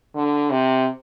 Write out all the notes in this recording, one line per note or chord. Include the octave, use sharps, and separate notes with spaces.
D3
C3